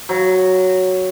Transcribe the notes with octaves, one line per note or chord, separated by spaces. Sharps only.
F#3